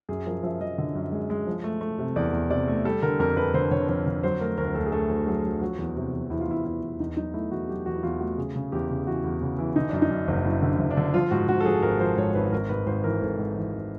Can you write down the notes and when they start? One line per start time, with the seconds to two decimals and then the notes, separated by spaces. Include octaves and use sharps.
0.09 F#2 G#4
0.26 F3 A#4
0.43 F3 E5
0.61 F3 D#5
0.78 D3
0.95 F#2
1.12 G#3
1.30 G#3
1.47 F3
1.64 A3
1.81 A3
1.99 C3
2.16 E2 D5
2.33 E2
2.50 C3 D5
2.68 A3
2.85 G3 A4
3.02 D3 A#4
3.19 F2 A#4
3.37 F2 B4
3.54 D3 C5
3.71 D3 C#5
3.89 F2 C#5
4.06 D3
4.23 F#3 C5
4.40 A3 A#4
4.58 D2 A#4
4.75 D2 A4
4.86 G#4
4.92 A3 A4
5.09 D2
5.26 F#3 G#4
5.44 F#3
5.61 F3 F#4
5.78 E2
5.96 C3
6.13 E2
6.30 E2 E4
6.40 F4
6.48 E2 E4
6.64 E2 E4
6.82 E2
7.00 E2 D#4
7.16 F#3 D#4
7.34 A3 E4
7.51 E2 F#4
7.68 F#3 G4
7.86 E2 F#4
7.95 E4
8.03 E2 F4
8.20 A3 F#4
8.38 C#3 G#4
8.56 C#3
8.72 E2 G4
8.89 C#3
9.07 E3 F#4
9.24 E2
9.41 C#3
9.59 E3
9.76 D3 D#4
9.89 F#2 D4
10.02 D#4
10.11 F#2
10.28 F#1
10.45 F#2 E4
10.62 D3
10.79 F#1
10.91 D4
10.97 D3
11.14 F3 F4
11.31 G#2 F#4
11.48 G#2 F#4
11.61 A4
11.65 F3 G#4
11.83 G#1 A#4
12.00 F3 C5
12.17 G#2 C#5
12.35 G#1 B4
12.52 G#1 A#4
12.69 G#2 B4
12.86 G#1 C5
13.04 E3 A#4
13.21 G#1 A4
13.38 G#2
13.56 E3
13.73 G#1